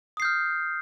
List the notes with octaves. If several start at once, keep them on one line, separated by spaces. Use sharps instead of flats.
D#6 F6 G6 C7